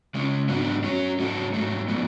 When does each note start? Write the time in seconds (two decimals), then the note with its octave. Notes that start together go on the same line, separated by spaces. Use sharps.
0.15 C#3 G#3 C#4
0.49 G#2 F#3 B3 D4 F#4
0.84 F#3 C#4 F#4 C#5
1.19 G#2 F#3 C#4 F#4 A4
1.54 G#2 F#3 A3
1.88 A2 F3 B3